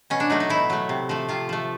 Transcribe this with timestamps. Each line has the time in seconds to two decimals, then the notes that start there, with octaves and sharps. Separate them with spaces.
0.10 B2 C#4
0.20 D4
0.30 F#3 A3 D#4
0.40 D#4
0.49 B2 E4
0.70 F#3 A3
0.89 C3
1.09 F3 A3
1.28 C3 F4
1.49 F3 A3